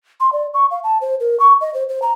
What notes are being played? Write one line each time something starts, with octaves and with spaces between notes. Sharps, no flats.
C6
D5
C#6
F5
A5
C5
A#4
C#6
D#5
C5
C5
A#5